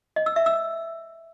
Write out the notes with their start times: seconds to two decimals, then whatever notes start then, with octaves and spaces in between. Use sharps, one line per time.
0.16 D#5
0.26 E6
0.36 E5
0.46 E6